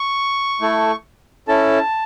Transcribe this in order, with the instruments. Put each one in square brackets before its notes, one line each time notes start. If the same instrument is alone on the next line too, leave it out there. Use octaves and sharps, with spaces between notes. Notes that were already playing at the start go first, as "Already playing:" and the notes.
Already playing: [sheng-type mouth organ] C#6
A3 E4 A4
C#4 E4 A4 A5